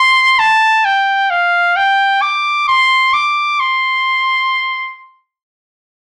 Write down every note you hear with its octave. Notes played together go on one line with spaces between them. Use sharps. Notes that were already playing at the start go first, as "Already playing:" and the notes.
Already playing: C6
A5
G5
F5
G5
D6
C6
D6
C6